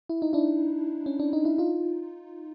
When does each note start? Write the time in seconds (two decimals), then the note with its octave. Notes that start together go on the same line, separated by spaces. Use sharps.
0.09 E4
0.22 D#4
0.33 D4 E4
1.06 C#4
1.20 D4
1.33 D#4
1.45 E4
1.58 D#4 F4